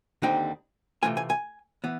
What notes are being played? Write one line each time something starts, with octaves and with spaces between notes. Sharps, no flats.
D#2 D3 G3 C4 D#4 G5
C3 E3 A3 F4 G#5
G#5
G#5
E3 B3